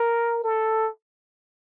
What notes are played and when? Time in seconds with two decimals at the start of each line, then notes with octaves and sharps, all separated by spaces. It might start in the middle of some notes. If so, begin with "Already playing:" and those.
Already playing: A#4
0.44 A4